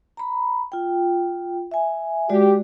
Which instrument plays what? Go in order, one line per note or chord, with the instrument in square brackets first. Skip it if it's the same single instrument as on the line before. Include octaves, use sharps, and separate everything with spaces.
[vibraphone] A#5 B5
F4 G5
E5 G#5
[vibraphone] G#3 F#4 D5 [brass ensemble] G4